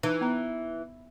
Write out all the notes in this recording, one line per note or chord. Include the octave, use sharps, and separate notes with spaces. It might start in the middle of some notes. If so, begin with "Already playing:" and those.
E3 D#4
B3 A#5